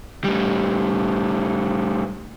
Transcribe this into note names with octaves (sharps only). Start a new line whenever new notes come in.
A2 G3